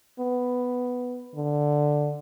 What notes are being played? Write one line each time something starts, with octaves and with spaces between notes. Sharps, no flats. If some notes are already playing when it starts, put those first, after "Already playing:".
B3
D3